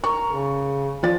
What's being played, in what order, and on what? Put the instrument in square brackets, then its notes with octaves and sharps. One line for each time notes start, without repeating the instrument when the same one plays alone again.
[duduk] A#4 [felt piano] C#6
[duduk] C#3
[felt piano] F3 D5 A6